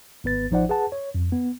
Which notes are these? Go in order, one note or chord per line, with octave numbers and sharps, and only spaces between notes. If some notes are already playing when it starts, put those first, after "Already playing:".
G#1 B3 B4 A6
A1 F3 D#4 C5 D5 F#5
G#4 B4 F#5 A5
C#5
F2
B3